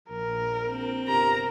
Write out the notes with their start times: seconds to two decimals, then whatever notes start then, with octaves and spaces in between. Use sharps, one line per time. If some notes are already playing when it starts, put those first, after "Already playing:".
0.10 A#1 A#4
0.71 C4
1.08 G1 C3 G4 A#4 A#5